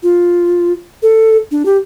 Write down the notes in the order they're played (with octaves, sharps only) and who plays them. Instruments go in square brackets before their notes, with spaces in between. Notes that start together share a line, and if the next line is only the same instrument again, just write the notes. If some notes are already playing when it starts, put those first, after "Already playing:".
[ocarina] F4
A4
D4
G4